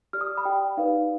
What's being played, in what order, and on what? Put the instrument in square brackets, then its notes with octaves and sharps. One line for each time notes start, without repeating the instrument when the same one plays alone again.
[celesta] G4 D5 F6
D#6
B5
G4 D5 G5
D#4 G4 B4 D5 F5